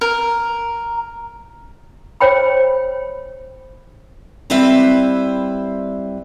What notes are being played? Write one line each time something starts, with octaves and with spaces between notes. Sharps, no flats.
A#4
C5 C#5 G5 B5
G3 C4 E4 B4 C5 E5